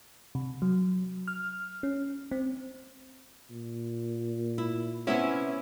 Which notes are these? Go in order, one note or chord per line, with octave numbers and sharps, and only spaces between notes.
C3
F#3
F6
C#4
C4
A#2
E4
C3 B3 C#4 E4 E5